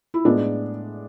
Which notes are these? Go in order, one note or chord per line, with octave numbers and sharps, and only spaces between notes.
E4
A2 G#3 B3 D4